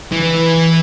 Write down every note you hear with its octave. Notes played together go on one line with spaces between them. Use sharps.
E3